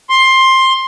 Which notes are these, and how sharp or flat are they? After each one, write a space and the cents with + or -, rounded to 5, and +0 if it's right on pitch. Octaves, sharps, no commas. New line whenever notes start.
C6 +15